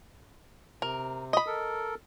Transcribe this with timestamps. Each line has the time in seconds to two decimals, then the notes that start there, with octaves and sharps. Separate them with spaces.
0.82 C3 A#4
1.33 D#5 B5
1.46 A4 A#4